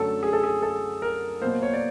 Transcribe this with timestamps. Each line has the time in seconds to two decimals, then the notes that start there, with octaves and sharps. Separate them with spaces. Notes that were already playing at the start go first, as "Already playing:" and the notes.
Already playing: F#2 D3 F#3 A3 A4
0.23 G#4
0.33 A4
0.44 G#4
0.62 A4
1.02 A#4
1.41 B2 F#3 A#3 C5
1.63 C#5
1.73 D5